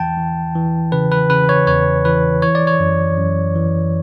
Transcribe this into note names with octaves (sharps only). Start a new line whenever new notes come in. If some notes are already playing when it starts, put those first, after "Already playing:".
Already playing: E2 E3 G5 A5
E3
E3
C#3 B4
B4
C#3 B4
C#5
E2 C#5
E3 B4
E3 C#5
D5
C#5
F#2
F#2
E3